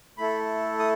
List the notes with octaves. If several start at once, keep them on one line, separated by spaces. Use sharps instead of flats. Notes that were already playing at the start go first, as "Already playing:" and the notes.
A3 E4 A4 B5
D#6